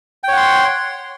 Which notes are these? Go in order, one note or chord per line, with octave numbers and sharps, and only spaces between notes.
C#5 F#5 G5 C6